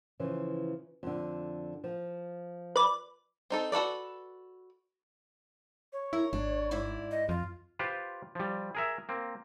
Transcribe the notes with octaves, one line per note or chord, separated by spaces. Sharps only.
C#3 E3 F3
F2 D3
F3
B4 D5
C4 D#4 A4
F#4 A4 B4 D5
C#5
E4 A#4
G#1 D4
G#2 E4 D5
D#5
F2 F4
F4 G4 B4 C5
F3 G3
G#4 A#4 E5
A#3 C4